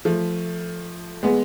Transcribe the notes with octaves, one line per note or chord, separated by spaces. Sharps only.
F3 A3
G#3 B3